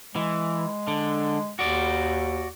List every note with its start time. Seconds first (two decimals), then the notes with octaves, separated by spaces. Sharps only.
0.16 E3 G#3
0.88 D3
1.59 D#2 F#4 D5